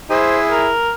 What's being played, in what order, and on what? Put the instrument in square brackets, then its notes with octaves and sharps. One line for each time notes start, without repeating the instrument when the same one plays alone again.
[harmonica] E4 G#4 [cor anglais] C5
[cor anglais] A#4